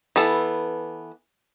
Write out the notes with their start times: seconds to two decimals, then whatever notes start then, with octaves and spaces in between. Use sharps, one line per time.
0.16 E3 B3 A4